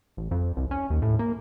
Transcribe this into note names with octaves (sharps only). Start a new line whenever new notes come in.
A1
F2
C2
C#4
D#2
A2
A#3